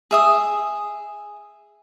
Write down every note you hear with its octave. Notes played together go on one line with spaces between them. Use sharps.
G#4 E5 D#6